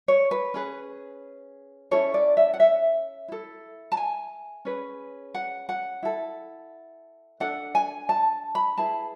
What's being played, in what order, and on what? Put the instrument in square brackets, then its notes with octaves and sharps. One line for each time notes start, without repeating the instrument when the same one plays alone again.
[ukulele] C#5
B4
C#4 G#4 B4
C#4 E4 A4 C#5
D5
E5
F#5
E5
E4 A4
A5
G#5
C#4 G#4 B4
F#5
F#5
E4 A4
D4 A4 F#5
G#5
A5
B5
E4 G#4 B4 A5